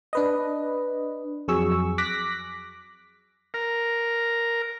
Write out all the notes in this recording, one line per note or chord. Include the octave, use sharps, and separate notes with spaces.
D4 B4 D#5
F2 F#3 G#4 C#6 E6
D6 F#6 A#6 B6
A#4